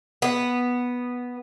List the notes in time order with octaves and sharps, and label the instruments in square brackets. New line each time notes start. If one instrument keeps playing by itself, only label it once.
[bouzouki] B3